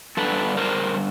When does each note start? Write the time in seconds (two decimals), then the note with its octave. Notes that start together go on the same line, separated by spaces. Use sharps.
0.17 G2 D3 F#3 A4 B4
0.57 A#4 C5